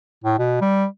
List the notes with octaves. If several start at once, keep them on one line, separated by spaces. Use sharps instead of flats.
A2
B2
G3